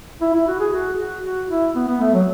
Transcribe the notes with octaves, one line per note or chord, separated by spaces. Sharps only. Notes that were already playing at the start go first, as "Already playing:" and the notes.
E4
E4
F#4
G#4
F#4
F#4
F#4
E4
B3
B3
A3
F#3